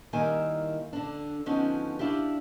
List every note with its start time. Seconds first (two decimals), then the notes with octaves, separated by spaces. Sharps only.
0.13 D#3 G3 A#3 E4 G#5
0.93 D3 D4
1.46 D3 F3 B3 C#4 D#4
1.99 D4 E4 F4 G4